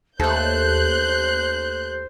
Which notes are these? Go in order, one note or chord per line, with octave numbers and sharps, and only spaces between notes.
D#2 A3 A4 C5 F#6 G6